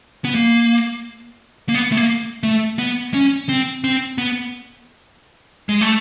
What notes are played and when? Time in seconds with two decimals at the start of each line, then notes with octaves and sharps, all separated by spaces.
0.25 B3
0.35 A#3
1.69 A#3
1.74 B3
1.92 A3
1.97 A#3
2.43 A3
2.79 B3
3.14 C#4
3.49 C4
3.84 C4
4.18 B3
5.69 G#3
5.81 A3